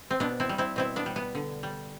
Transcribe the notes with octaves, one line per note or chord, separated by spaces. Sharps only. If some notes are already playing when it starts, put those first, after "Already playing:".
C4
B2 B3 D4
C4 E4
G3
C4 E4
B2 C4 E4
B3 D4
G3
B3
D3
G3